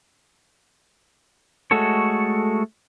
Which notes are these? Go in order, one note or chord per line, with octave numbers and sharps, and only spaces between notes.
G#3 A3 F#4 A4 C#5